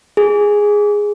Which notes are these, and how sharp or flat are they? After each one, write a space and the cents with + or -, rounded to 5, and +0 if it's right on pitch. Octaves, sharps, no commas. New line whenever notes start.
G#4 -5